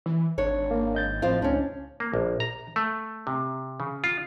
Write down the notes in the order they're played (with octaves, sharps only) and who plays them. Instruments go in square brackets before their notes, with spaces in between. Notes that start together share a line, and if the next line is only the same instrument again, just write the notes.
[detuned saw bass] E3
[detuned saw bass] G#1 [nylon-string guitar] D4 C#5
[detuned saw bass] G#1 [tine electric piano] A#3
[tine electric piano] D#5 G6 A6
[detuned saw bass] A2 [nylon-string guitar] F3 C4 F4
[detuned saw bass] C#2 [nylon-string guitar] C#4 D4
[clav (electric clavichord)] A#3
A#1
A#5
A3
C3
C#3
F4